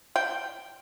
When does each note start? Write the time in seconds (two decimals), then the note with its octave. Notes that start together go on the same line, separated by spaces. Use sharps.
0.16 G5